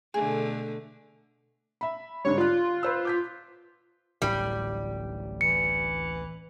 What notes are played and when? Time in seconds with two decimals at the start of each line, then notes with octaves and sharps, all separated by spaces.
0.14 B2 D3 A3 G#4
1.81 E5 B5
2.24 G#2 D3 G3 C#5
2.38 F4 D5 F#6
2.83 B4 C5 E6
3.05 D6 G6 B6
4.22 D1 A1 G3
5.41 E3 C#7